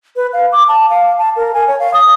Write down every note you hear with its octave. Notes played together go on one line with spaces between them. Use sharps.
B4
F5
D6
A5
F5
A5
A#4
G#5
C#5
F5
D#6